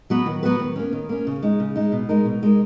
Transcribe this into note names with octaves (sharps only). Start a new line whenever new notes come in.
F#3 B3 F#4 B4
D#3
F#3 B3 F#4 B4
D#3
A#3 C#4
D#3
A#3 C#4
C#3
G#3 D#4
C#3
G#3 D#4
B2
G#3 D#4 A#4
B2
G#3 D#4 A#4